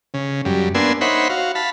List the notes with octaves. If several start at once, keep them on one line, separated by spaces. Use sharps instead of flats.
C#3
F#2 G3
A#3 B3 D4 G#5 C6 E6
D#4 C5 C#5 E5 F#5 B5
F#4 F5
F5 A5 B5